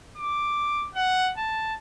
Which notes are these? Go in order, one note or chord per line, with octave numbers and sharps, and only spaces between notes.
D6
F#5
A5